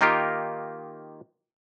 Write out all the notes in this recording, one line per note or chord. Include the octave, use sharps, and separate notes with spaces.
D#3 A#3 D#4 F4 G4 A#4